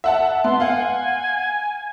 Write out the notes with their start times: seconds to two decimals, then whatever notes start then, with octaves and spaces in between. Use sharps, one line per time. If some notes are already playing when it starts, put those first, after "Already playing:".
0.04 E5 F#5 A5
0.44 B3 C6
0.60 F5 F#5 G#5